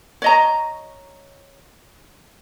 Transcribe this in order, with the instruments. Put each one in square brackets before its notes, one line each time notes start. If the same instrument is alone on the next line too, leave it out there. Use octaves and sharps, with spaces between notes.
[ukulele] C#5 D#5 A#5